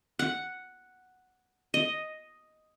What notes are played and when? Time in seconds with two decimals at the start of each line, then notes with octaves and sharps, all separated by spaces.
0.19 F#5
1.74 D#5